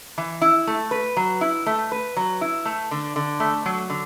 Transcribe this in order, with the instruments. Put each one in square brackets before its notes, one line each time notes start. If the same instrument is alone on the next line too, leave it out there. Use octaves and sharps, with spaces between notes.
[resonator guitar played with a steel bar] E3
E4
A3
B4
F#3
E4
A3
B4
F#3
E4
A3
D3
D3
A3
F#3
D3